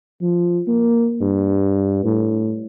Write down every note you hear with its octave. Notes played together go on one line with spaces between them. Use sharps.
F3
A#3
G2
A2